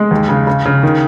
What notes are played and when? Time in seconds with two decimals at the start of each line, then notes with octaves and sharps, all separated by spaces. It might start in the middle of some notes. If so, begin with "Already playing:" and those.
Already playing: G#3
0.11 D#2
0.29 C#3
0.47 C#3
0.65 C#3
0.83 D#3